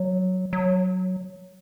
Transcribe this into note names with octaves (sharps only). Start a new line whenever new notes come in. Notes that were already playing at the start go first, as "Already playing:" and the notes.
Already playing: F#3
F#3